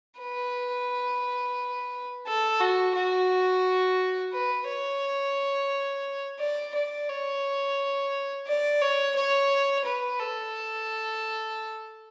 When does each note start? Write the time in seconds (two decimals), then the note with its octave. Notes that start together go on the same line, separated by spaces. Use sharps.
0.20 B4
2.27 A4
2.61 F#4
2.95 F#4
4.33 B4
4.68 C#5
6.40 D5
6.75 D5
7.09 C#5
8.47 D5
8.81 C#5
9.16 C#5
9.85 B4
10.19 A4